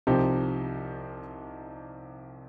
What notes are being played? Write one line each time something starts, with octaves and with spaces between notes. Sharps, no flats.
C2 C3 F3 D#4 G4